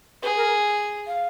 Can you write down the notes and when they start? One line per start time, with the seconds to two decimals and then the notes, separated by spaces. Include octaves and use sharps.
0.23 G#4 B4
0.37 A#4
1.07 F5